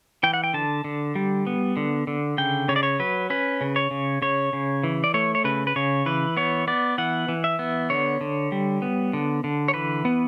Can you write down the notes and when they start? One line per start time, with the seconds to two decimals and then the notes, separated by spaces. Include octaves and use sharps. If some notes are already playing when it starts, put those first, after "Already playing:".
0.23 E3 G5
0.34 F#5
0.44 G5
0.54 D3 A5
0.84 D3
1.15 G3
1.47 B3
1.77 D3
2.07 D3
2.38 C#3 G5
2.68 C#3 C#5
2.76 D5
2.83 C#5
3.00 F#3 B4
3.30 C#4 B4
3.61 C#3
3.76 C#5
3.91 C#3
4.22 C#3 C#5
4.53 C#3
4.84 E3
5.04 D5
5.14 A3 C#5
5.35 C#5
5.44 C#3 B4
5.67 B4
5.76 C#3 C#5
6.06 E3 B4
6.37 B3 C#5
6.67 B3 D5
6.98 E3 F#5
7.28 E3
7.44 E5
7.59 B3
7.90 D3 C#5
8.21 D3
8.52 G3
8.82 B3
9.13 D3
9.44 D3
9.68 C#5
9.74 E3 B4
10.05 B3